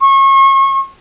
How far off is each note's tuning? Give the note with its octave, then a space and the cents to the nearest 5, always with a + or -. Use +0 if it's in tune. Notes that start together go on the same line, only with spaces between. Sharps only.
C#6 -35